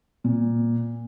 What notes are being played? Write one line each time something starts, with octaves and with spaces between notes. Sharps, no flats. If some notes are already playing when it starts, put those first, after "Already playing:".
A#2